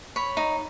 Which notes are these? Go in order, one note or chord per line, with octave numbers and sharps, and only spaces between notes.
C#5 B5
D#4